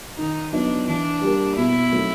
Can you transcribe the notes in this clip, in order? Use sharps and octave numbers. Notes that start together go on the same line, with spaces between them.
D#3 D#4
F#3 B3 D4 D#4
E3 D4
G3 A#3
B2 E4
F#3 A3 C4 D#4